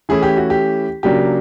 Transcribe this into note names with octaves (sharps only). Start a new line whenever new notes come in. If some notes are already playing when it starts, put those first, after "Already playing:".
E3 A3 C#4 E4 G#4
G4
F#4
G4
C#3 F#3 A#3 D4 G4